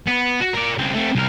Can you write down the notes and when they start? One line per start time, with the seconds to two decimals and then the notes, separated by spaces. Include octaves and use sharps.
0.08 B3
0.40 F#4
0.53 A#4 D5
0.78 C#2 C4
0.94 A3 C4
1.15 C2 A#4